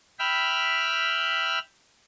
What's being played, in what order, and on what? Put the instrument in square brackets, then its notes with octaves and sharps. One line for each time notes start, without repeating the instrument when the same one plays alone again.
[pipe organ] E5 G5 B5 F6